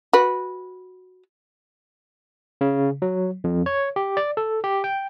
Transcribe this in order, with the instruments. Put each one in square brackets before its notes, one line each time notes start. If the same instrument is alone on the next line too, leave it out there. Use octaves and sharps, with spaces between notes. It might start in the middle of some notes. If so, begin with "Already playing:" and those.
[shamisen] F#4 B4
[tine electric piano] C#3
F#3
F2
C#5
G4
D5
A4
G4
G5